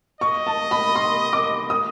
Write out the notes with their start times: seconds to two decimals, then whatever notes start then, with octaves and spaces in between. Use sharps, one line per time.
0.21 D#5 C#6
0.47 A5
0.71 B5
0.96 C6
1.33 D6
1.70 D#6